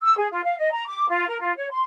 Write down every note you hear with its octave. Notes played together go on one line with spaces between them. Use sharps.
E6
G#4
F4
F5
D#5
A#5
D6
F4
A#4
F4
C#5
C6